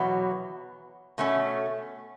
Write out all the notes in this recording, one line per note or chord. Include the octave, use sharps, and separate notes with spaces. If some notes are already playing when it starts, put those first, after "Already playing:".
Already playing: E2 B2 F#3
B2 A3 C#4